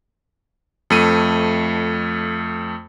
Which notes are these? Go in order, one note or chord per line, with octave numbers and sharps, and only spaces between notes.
F2 A3 D#7